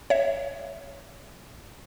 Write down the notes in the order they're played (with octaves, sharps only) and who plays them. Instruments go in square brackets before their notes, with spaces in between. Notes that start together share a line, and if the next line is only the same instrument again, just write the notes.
[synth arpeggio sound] C#5 E5